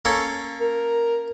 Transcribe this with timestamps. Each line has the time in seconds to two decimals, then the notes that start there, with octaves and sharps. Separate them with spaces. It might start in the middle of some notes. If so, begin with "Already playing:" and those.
0.05 A#3 C#4 A4
0.60 A#4